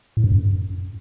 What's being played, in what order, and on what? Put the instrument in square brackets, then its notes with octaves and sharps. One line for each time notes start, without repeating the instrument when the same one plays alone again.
[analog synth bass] A2
G2
F#2